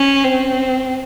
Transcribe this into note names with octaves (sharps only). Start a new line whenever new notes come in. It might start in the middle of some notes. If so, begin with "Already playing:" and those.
Already playing: C#4
C4